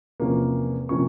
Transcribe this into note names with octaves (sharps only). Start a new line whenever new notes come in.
E2 C3 F3 A#3 C#4
C3 F3 A#3 C#4 C#6